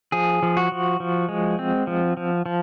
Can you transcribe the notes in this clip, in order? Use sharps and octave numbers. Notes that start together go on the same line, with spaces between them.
F3 G#4
F3
F#4
F3
F3
G#3
C4
F3
F3
F3